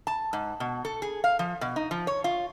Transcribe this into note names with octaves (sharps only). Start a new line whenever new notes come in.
A5
G#2
B2
A4
G#4
F5
F3
B2
D#4
F3
C#5
F4